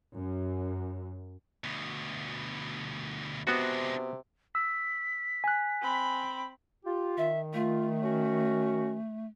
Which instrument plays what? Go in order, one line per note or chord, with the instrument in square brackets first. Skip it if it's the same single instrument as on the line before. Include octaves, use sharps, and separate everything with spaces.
[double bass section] F#2
[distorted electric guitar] D2 B2
[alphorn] C3 [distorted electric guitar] G#3 D4 [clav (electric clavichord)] B3 F#4
[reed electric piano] E6 [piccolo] B6
[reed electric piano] G#5 F#6
[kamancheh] C4 B5
[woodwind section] F4 [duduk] G4
[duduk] D#3 [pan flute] E5
[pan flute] A3 [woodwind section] F4
[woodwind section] C#4 F#4